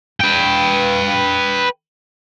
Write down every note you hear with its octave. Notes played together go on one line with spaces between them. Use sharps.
B4 G5